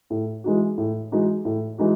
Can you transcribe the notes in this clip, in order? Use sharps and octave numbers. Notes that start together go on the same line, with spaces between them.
A2
E3 G#3 D#4 F#4
A2
E3 G#3 D#4 F#4
A2
E3 G#3 D#4 F#4